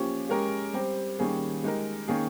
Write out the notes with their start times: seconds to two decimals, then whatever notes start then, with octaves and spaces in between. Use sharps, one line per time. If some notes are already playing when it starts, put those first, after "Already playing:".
Already playing: F3 A#3 C#4 G4
0.29 G#3 C#4 G4 A#4
0.73 G3 C4 G4
1.19 D#3 G3 A#3 C#4 G#4
1.63 G#3 D#4 G4 A#4
2.08 D#3 A#3 C#4 G#4